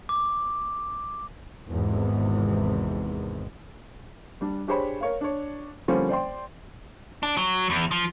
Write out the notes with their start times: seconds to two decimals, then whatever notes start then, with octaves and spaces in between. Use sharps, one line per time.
0.09 D6
1.67 G#1 E2 G#2 C3
4.41 G3 D4
4.68 D4 G4 G#4 C5 C#5 B5
5.01 A#4 C#5 F5
5.21 D4 C#5
5.88 D3 F3 G3 A#3 C4 C#4
6.09 C5 D5 G5 C6
7.23 D4
7.37 F#3
7.70 E2
7.91 F3